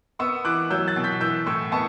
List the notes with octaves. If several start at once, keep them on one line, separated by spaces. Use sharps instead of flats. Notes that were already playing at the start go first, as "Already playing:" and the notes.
B3 C#6 E6
E3 D6 F#6
F#3 E6 G6
F#6 A6
B2
G6 B6
E3 E6 G6
A2 C#6 E6
B3 A5 C#6